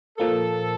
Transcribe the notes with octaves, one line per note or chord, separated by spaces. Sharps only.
A#2 F3 A#3 A4